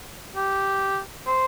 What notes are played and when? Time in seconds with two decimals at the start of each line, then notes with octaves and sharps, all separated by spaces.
0.36 G4
1.27 C5